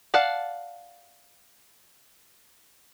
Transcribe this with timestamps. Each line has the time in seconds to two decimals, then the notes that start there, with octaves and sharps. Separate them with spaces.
0.14 D5 F5 F#5 A5